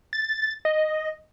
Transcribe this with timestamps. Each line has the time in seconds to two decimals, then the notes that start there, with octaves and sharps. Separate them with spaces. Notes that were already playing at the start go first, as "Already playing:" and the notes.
0.13 A6
0.65 D#5